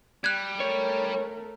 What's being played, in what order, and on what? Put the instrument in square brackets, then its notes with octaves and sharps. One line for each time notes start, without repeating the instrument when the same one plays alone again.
[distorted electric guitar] G3 [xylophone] F#6 G#6
[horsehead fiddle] A3 A#4 [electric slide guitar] C#5